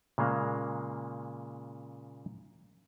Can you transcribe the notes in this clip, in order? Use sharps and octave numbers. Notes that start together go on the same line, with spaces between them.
A#2 C#3 G#3 A#3